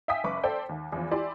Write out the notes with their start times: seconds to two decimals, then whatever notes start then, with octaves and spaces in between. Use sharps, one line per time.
0.08 E5 F5 G5 G#5 D#6 B6
0.24 F#1 B4 C#6 D6
0.43 A4 C5 D5 G5
0.69 D#2
0.92 E2 F3
1.11 E4 G4 D5 G#5 C6